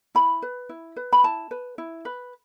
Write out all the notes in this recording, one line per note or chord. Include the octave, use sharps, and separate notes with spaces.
E4 B5
B4
E4
B4
B5
E4 A5
B4
E4
B4